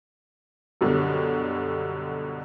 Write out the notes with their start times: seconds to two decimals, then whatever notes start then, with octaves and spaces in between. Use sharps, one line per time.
0.81 F#2 B2 D3 G3